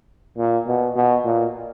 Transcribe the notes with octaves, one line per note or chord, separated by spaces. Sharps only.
A#2
B2
B2
A#2